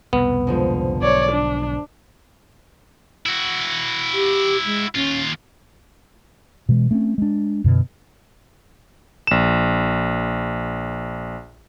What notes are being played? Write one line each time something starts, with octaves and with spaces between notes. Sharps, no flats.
C2 F2 B2 B3
G#2 D3 F3
B1 C#5 D5
D4
E4 F#4
G4
G#3
D#2 C#4 F4
B2 E3 G#3
A3 C4 C#4
G#3 D4
F#2 B2 D3
A#1 E7